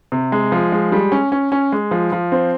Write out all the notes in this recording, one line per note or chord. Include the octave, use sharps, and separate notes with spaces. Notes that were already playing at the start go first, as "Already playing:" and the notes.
C3
G#3
F3
G#3
G3
C#4
C#4
C#4
G#3
F3
F3
C4